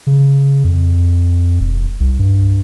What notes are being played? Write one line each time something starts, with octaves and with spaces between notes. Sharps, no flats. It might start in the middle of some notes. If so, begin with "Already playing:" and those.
C#3
F2
E1
C2
G2